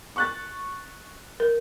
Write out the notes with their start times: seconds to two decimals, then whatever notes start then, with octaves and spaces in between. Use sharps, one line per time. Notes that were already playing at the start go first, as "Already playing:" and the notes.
0.16 C#6 F#6 A6
1.40 A#4